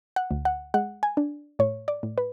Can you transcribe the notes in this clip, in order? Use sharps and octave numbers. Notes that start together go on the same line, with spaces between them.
F#5
D2
F#5
G#3 F#5
G#5
D4
A2 C#5
D5
A2
B4